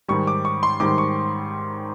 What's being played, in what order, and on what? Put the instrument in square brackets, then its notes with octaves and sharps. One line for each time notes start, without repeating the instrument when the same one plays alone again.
[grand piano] G#2 D#3 G3 C#6
D6
C#6
C6
G#2 D#3 G3 D6
C#6